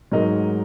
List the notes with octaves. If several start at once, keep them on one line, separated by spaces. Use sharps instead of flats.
G#2 F#3 D#4 A#4 D#5